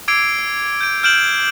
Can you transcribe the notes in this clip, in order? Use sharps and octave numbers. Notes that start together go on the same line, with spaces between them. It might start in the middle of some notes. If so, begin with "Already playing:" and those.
D6 E6 G#6 C7 D7
G6 D7
F6 G6 D7 E7 F#7